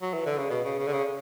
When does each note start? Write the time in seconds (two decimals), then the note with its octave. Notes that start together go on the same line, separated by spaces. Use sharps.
0.02 F#3
0.14 E3
0.26 D3
0.38 C#3
0.50 B2
0.64 C#3
0.79 C#3
0.87 D3
0.93 C#3